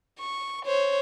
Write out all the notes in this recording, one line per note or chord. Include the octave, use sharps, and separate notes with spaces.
C#6
C5 C#5